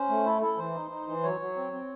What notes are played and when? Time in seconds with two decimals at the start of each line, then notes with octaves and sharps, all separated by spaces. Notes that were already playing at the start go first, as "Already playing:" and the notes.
Already playing: C#4 C5
0.09 A3
0.25 E4 A4
0.42 E4 A4
0.58 E3 C5
0.75 D#4
0.91 D#4
1.07 E3
1.23 F#3 C#5
1.40 F#3
1.56 C4
1.72 C4